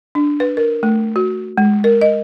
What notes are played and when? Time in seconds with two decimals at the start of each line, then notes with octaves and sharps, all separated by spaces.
0.15 D4
0.40 B4
0.57 A#4
0.83 A3
1.16 F#4
1.58 G#3
1.84 A#4
2.02 D#5